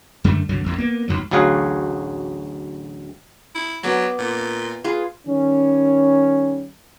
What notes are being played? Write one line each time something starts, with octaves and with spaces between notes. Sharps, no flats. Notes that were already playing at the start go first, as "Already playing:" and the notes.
F#2 D3 G3 A3
C2 G2 D3 F#3
A1 E2 A2
A#3 B3
B1 F2 G#2 F#3
A1 D2 F#3 G#4 F5 F#5
E4
F#3 B3 D5 B5
A#2
F4 G#4 B4
D#3 G3 C#4